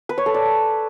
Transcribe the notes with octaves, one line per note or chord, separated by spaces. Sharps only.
B4
C#5
A4
D5